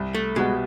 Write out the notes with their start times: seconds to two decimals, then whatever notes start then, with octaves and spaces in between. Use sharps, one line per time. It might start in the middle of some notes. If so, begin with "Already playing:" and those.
Already playing: C2
0.15 A3
0.36 B2 G3 G#3 B3